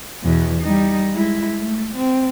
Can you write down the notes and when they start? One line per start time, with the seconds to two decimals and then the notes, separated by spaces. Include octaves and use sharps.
0.24 E2 B2
0.61 G3 D#4
1.14 G#3 E4
1.60 A3
1.95 C4